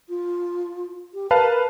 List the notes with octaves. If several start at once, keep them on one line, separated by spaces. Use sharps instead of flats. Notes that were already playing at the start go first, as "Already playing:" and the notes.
F4
G4
A#4 B4 F5 A5